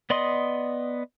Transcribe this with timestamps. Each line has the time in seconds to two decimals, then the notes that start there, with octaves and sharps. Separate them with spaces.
0.10 B3 D5 D#5 C6 D#6